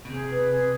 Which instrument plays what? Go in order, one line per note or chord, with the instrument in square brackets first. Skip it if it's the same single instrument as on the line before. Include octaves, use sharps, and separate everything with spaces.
[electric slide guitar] B2
[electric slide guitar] C3 [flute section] G#4
[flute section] B4
G#4